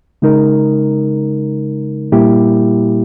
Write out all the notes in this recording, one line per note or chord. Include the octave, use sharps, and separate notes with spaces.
C#3 G#3 D#4 A#4
A#2 G3 A#3 E4 G4